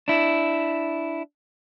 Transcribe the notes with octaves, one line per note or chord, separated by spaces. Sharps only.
D4 E4